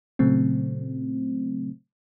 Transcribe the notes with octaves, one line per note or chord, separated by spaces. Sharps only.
A#2 C#3 F#3 A3 C4